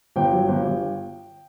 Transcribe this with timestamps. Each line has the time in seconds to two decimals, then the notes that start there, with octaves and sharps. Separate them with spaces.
0.16 G1 G5
0.32 F#3
0.48 G1
0.63 G1